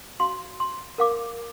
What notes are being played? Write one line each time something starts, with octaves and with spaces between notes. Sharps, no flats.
F#4 F5 C6
C6
A#4 F5 D6